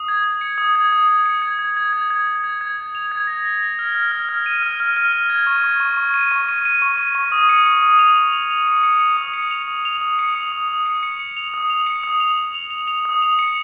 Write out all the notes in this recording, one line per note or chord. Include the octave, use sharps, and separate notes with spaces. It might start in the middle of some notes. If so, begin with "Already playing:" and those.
Already playing: D#6
G#6
G#6
C#7
D#6
G#6
D#6
D#6
C#7
G#6
G#6
G#6
G#6
G#6
G#6
G#6
G#6
G#6
F7
G#6
A#6
A#6
A#6
F6
F6
F6
F6
D#7
F6
F6
F6
F6
G#6
C#6
C#6
C#6
C#6
D#7
C#6
D#7
D#7
C#6
D#7
C#6
D#6
C#7
D#6
D#6
F7
F7
F7
F7
C#7
C#7
C#7
D#6
C#7
F7
D#6
F7
D#6
C#7
D#6
D#6
D#6
C#7
C#7
C#7
F7
D#6
F7
C#7
D#6
F7
F7
F7
F7
F7
D#6
F7
C#7